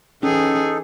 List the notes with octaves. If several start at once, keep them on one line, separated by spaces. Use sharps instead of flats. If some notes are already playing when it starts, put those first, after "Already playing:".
E3 C#4 D#4 G#4 A4